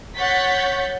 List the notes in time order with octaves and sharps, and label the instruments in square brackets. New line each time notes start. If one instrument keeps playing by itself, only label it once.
[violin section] C#5 F#5 C#6 G6 A6 B6